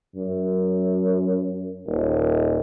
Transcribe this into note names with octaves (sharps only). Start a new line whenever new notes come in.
F#2
D#1